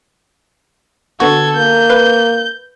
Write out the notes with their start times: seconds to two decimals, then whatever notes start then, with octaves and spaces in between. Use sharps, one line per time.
1.20 D3 B3 F#4 A4 G#6
1.56 A#3 G6
1.90 B4 F5